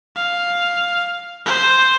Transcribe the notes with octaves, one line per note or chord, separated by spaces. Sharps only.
F5
C5